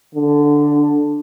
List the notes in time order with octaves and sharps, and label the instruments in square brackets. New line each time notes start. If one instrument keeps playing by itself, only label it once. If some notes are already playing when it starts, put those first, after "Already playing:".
[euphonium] D3